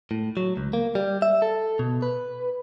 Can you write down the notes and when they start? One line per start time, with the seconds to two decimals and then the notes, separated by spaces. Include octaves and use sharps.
0.11 A2
0.37 F#3
0.57 C#2
0.73 A#3
0.95 G3
1.22 E5
1.42 A4
1.79 B2
2.02 B4